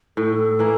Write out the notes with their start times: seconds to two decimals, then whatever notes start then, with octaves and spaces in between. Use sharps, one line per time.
0.17 A2 A4
0.59 E3 A#3